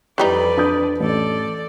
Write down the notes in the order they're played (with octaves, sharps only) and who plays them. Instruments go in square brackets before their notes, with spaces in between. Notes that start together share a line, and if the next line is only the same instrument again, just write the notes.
[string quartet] F2 B4 D5 [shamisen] E3 G3 D#4
[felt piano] D4 D#6 G6
[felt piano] A1 [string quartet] A4 D5